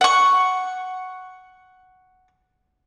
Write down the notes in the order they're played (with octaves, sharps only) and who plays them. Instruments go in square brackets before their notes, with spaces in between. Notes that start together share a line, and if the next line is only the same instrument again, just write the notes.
[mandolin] F#5 C#6